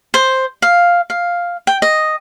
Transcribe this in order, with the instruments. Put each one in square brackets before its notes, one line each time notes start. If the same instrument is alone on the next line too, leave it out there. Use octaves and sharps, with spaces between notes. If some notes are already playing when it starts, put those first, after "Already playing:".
[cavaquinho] C5
F5
F5
G5
D#5